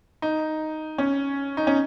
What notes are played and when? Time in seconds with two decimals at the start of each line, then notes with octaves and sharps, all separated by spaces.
0.22 D#4
0.98 C#4
1.57 D#4
1.67 C#4